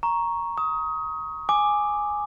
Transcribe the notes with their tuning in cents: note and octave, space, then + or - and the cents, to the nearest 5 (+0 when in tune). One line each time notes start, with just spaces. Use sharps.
A#5 +5 C#6 +0
A#5 +5 D#6 +25
G#5 +0 D6 +10